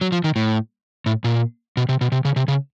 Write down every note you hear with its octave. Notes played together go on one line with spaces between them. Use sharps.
F#3
F3
D#3
A2
A2
A#2
B2
C3
B2
C3
C#3
C3
C#3